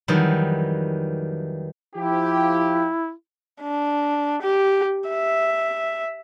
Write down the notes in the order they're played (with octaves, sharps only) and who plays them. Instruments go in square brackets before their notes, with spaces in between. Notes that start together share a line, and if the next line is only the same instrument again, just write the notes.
[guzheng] F2 D#3 E3 F#3 G3
[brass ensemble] F3 G4 [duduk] E4
[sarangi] D4
G4
E5